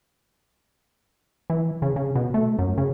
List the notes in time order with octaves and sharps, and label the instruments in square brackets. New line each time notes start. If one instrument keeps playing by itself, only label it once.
[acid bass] E3
C#3
C#3
B2
A3
F#2
C#3